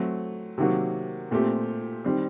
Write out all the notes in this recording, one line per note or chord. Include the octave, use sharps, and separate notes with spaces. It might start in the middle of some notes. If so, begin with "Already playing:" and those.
Already playing: F#3 A3 C4
C3 D#3 F#3 A#3 F#4
A#2 A3 C4 G4
D#3 G3 C4